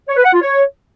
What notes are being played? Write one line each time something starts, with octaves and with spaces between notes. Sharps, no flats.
C#5
B4
F#5
F4
C#5